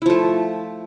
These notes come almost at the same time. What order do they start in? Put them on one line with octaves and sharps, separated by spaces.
E4 F3 A3